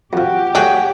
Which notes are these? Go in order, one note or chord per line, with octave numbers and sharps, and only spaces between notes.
F2 F3 F#4 G4
D3 F#3 A3 F#4 G#4 C#5 G5